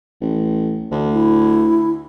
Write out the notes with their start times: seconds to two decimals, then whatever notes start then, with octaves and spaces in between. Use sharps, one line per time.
0.21 A1
0.91 D2
1.13 E4